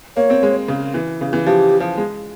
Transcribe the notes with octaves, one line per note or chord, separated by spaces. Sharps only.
A#3 C#5
C4
G#3
C#3
E3
C#3
E3
F3 G4
F3
G#3